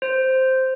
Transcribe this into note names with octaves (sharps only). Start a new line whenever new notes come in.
C5